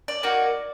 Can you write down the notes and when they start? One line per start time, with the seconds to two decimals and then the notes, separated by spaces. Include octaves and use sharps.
0.08 D5
0.23 A#3 D#4 F#4